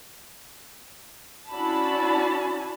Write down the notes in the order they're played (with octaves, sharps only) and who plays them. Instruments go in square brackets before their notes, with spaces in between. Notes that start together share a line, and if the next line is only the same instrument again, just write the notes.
[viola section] C#4 D4 E4 F#4 A5 B5